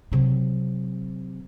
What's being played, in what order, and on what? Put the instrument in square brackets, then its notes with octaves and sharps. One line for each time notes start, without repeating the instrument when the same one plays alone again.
[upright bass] C3 F#3